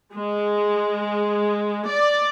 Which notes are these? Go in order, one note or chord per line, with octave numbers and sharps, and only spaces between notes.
G#3
D5